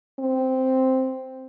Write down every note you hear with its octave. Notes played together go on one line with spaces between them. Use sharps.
C4